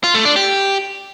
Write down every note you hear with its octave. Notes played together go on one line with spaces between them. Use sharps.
F4
A3
D4
G4